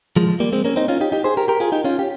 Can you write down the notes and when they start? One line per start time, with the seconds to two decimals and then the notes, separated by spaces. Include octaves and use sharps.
0.16 F3 G#3
0.40 G3 A#3
0.52 G#3 C4
0.65 A#3 C#4
0.76 C4 D#4
0.88 C#4 F4
1.01 D#4 G4
1.12 D#4 G4
1.24 G#4 C5
1.37 G4 A#4
1.48 G4 A#4
1.60 F4 G#4
1.72 D#4 G4
1.85 C#4 F4
1.99 G4